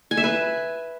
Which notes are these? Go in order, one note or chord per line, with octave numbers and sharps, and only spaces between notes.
G#5
E5
B4